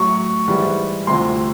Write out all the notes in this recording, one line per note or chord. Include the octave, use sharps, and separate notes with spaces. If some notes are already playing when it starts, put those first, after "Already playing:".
Already playing: A2 F#3 C#6
G#2 E3 G3
D2 C3 F3 C6